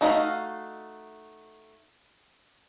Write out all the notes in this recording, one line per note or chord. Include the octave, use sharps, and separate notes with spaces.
A3 D#4 F#4 D#5 F5